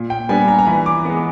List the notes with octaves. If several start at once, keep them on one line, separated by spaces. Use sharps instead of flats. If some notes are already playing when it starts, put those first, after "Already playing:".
Already playing: A#2
G5
G3 B3 D4 G#5
A#5
A#5
E3 B5
D6
G#3 B3